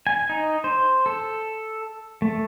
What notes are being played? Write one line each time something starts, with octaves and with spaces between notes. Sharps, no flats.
G#5
D#4
C5
A4
A3